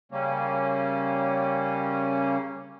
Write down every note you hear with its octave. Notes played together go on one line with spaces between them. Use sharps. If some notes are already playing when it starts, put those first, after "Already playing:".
C#3 G3 A#3 C#4